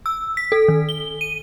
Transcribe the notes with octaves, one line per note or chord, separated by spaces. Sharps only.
E6
B6
A4
D#3
G7
D#7